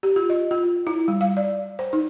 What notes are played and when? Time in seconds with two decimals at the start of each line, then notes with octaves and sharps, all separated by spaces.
0.03 G4
0.16 F4
0.30 D#5
0.51 F4
0.87 E4
1.08 G3
1.21 F5
1.37 D5
1.79 C5
1.93 D#4